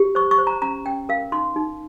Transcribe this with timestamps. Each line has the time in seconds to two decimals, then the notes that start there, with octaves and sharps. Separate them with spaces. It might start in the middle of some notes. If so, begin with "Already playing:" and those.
Already playing: G4
0.15 C5 C#6
0.31 C#6
0.38 C5
0.47 A#5
0.62 C#4 A#5
0.86 C#4 G5
1.09 A#4 F5
1.32 D#4 C6
1.56 D#4